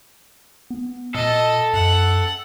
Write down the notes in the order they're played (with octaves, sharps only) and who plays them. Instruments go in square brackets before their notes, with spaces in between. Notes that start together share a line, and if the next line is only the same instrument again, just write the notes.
[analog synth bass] B3
[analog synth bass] A#2 [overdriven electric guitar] A4 [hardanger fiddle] D#5
[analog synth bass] F#2 [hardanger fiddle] F#5